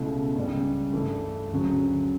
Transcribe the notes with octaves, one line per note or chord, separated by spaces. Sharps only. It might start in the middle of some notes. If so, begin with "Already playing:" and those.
Already playing: C#2 B2 A3 E4
C#2 C#3 G3
G2 E3 A3 E4
D2 C#3 F#3